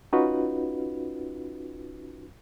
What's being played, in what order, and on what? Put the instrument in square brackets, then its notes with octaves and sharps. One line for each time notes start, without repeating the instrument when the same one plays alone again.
[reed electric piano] C#4 D#4 F4 F#4 B4